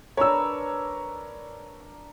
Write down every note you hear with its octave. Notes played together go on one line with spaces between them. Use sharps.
D4 A#4 B4 C#5 A#5 E6